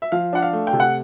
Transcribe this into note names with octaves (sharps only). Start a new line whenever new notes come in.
E5
F3 F5
D4 F#5
F5
A3
G5
C3
F#5